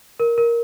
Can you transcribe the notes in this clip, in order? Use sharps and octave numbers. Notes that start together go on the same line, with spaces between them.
A#4
A#4